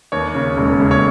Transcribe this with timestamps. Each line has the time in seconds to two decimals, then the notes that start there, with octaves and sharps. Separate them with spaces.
0.12 D#2 C#5
0.35 C#3
0.57 E1
0.80 C#3
0.91 C#5